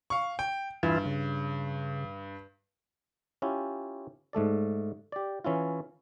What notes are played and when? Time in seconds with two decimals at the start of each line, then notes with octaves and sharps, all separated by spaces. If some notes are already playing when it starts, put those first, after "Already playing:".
0.10 F5 C#6
0.39 G5
0.83 G2 E3 E4 F4
1.05 C#3
3.42 C#4 E4 F4 G4
4.33 G#2 A3 A4 D5
5.12 G4 D5
5.45 E3 C#4 E4 F4